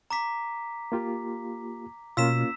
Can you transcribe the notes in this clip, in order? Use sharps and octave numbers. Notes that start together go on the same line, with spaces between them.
A#5 D6 B6
A#3 F4 G4
B2 A#3 C#4 F4 E6 B6 E7